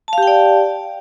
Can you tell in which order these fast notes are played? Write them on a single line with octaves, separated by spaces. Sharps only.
A5 F5 G4 G5 D5